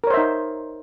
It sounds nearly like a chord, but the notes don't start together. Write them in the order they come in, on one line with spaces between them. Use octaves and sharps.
A#4 C#5 C5 E5 D#4